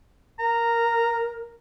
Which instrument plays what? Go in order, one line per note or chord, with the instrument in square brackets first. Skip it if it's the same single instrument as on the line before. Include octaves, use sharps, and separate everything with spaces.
[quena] A#4 [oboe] A#5